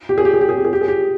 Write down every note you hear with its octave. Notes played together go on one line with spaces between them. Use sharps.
G4
G#4
G4
G#4
G4
G#4
G4
G#4
G4
G#4
G4